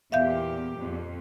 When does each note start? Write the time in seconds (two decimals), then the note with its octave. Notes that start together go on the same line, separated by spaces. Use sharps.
0.12 E2 A#2 G4 E5 F5 G6
0.78 F2